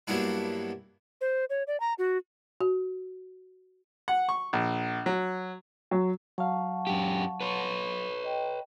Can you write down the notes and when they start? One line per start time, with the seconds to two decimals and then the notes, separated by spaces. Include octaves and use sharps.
0.07 G2 F#3 A#3 B3 D4 E4
1.21 C5
1.50 C#5
1.67 D5
1.80 A#5
1.99 F#4
2.61 F#4
4.08 F#5
4.29 C#6
4.53 A#1
5.06 F#3
5.91 F#3
6.38 F#3 F5 F#5 A5 C#6
6.87 F#2 G4
7.41 B4 C#5
8.24 D#5 G5